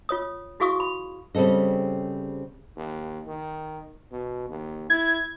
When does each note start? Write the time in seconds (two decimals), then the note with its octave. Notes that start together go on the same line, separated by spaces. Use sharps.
0.09 F4 C#5 D#6
0.60 E4 F#4 G#4 F5 C#6 D#6
0.80 B5
1.35 C#3 G3 C4 A4 D#5
2.76 D#2
3.27 D#3
4.12 B2
4.50 D#2
4.90 E4 G#6